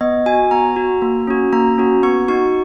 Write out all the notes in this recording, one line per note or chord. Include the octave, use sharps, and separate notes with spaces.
B3 D#5
F#4 G#5
B3 A#5
F#4
A#3
C#4 F#4
A#3 A#5
C#4 F#4
B3 C#6
D#4 F#4 C#6